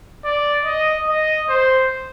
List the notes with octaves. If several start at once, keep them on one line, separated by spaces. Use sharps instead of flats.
D5
D#5
D#5
C5